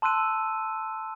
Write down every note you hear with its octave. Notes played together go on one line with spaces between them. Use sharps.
A5 C6 E6 F#6 D#7